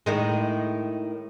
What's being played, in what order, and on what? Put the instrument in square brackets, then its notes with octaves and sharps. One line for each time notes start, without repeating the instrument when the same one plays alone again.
[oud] A2 D#3 G#3